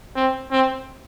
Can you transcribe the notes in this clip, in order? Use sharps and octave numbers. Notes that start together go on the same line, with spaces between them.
C4
C4